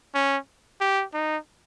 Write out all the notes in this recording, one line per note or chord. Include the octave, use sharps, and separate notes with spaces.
C#4
G4
D#4